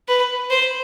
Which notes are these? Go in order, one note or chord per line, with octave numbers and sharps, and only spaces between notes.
B4
C5